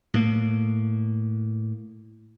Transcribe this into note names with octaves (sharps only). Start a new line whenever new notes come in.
A2 A#3